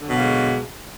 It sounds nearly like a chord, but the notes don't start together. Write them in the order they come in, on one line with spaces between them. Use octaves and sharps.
D3 F#3 B2 A#3 G#3